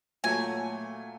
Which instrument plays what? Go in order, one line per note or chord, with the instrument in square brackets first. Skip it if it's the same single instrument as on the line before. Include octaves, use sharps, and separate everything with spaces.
[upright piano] A#2 F#3 A3 [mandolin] G#5